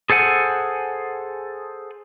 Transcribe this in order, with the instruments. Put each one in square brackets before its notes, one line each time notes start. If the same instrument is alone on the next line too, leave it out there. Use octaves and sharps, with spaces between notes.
[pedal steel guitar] G#4 A4 C5 F#5 G#5